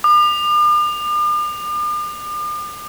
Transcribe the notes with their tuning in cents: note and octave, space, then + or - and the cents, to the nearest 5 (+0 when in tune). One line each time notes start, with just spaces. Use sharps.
D6 +45